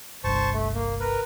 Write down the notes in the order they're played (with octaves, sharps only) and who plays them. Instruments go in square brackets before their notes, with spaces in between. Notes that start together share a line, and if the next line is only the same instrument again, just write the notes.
[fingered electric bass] G1 C2 G2 [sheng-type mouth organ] C5 A5 C#6
[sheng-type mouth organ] A3
A#3
A#4 B4